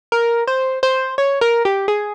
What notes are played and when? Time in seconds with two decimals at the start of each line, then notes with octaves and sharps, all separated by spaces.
0.12 A#4
0.47 C5
0.83 C5
1.18 C#5
1.41 A#4
1.65 G4
1.88 G#4